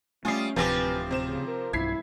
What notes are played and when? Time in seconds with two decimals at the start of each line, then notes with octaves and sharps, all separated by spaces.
0.25 G3 A3 C#4 F4 G#5 D#6 C7
0.56 D1 C3 F3 C4 G4 B4 G#5 A#6
1.11 C3 C5 E7
1.25 C#3
1.47 A#4
1.73 B1 G2 E4 G#6 B6 C7